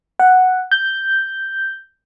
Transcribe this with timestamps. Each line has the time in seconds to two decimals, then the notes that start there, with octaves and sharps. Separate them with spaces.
0.19 F#5
0.71 G6